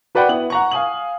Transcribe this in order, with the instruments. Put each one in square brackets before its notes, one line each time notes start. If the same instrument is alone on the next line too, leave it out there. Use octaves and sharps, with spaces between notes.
[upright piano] F#4 B4 D5 F#5 G5 B5
B3 E4 F#7
F#5 A#5 C#6
F5 G#5 D#6 F#7